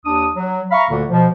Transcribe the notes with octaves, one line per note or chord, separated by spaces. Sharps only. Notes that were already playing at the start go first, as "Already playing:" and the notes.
D#2 D4 D#6
F#3
E5 F5 A#5 B5 C#6
D2 A#2 D3 A#3
B2 F3